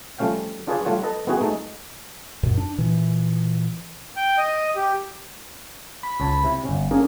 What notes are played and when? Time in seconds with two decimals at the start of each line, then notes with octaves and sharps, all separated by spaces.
0.18 F3 G3 A3 C#4 F5 G5
0.67 D4 F4 G#4 B4 C#5 D5
0.85 G3 A3 F4 C#5 F#5
1.03 A4 B4 D#5 A5
1.27 B3 C4 E4 F#4 G#4 F#5
1.41 G#3 A3 D#4 A4
2.43 F#2 A#2
2.57 D4
2.78 A#2 E3
4.16 G5
4.38 D#5
4.76 G4
6.03 B5
6.20 C#2 C#5 A5
6.44 C3 E4
6.65 G1 C#4
6.91 A#3 C#4 D4 G#4 A#4